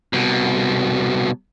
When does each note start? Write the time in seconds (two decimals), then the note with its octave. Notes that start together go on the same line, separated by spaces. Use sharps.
0.13 C2 B2